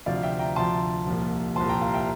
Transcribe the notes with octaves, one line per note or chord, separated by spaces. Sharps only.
D2 C3 F3 D5 F5
E5 G5
G5 A#5
D2 C3 F3 A5 C6
C2 A#2 F3
C2 A#2 F3 A5 C6
G5 A#5
F5 A5
E5 G5